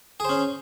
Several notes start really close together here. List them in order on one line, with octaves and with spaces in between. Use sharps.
G#4 C5 C#4